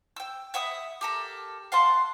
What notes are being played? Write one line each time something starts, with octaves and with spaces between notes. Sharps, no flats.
G5 E6
E5 F#5 B5 D#6
G4 A4 A#4
F5 F#5 A5 C6